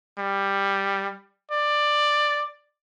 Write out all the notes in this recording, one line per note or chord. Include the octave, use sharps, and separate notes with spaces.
G3
D5